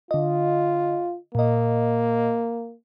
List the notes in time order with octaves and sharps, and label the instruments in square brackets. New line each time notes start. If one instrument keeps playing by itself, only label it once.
[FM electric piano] D3 D#5 [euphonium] F4
[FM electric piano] A#2 D#5 [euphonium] A#3